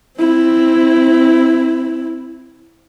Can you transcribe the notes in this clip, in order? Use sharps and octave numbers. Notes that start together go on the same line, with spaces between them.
C4 E4